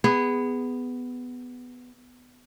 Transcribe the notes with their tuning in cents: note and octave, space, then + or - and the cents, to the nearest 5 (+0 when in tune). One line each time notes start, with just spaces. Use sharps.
B3 +10 G#4 -15